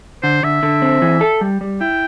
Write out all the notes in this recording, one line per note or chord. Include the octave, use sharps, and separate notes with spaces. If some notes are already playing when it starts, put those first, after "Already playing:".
D3 C5
D3 E5
D3
C4
E3
A4
G3
G3
E4 G5